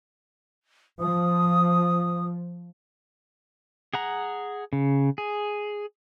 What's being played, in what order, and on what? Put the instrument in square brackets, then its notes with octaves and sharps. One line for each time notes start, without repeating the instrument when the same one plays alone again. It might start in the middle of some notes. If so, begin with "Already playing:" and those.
[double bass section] F3 [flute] D#6
[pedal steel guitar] G#4 F#5 A#5
C#3
G#4